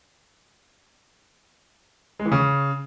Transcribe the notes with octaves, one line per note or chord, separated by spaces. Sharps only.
G#3
E3
C#3